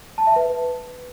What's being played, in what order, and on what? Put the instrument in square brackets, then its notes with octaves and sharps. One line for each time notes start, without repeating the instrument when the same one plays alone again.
[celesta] A5
E5
B4